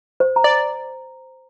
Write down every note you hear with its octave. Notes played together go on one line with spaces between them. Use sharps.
C5
A#5
D5
A#5